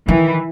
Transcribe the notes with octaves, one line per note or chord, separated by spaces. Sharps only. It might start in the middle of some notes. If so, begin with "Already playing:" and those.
D#3 E3